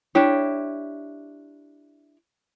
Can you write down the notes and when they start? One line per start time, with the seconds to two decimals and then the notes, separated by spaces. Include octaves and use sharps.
0.15 D4 E4 G4 C#5